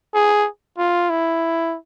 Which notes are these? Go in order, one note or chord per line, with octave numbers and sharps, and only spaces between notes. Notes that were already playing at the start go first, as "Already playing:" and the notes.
G#4
F4
E4